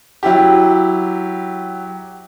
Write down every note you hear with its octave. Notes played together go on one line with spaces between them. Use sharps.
F#3 E4 G4